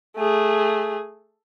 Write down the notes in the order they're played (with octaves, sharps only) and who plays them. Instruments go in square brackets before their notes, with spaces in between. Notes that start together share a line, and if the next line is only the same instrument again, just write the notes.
[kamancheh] A3 G#4